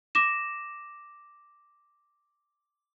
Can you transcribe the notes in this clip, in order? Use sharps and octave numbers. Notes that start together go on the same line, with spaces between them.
D6 A#6 E7